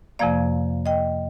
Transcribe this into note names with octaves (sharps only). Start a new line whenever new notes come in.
F2 C3 F3 A#3 D5 F5
D#5 G5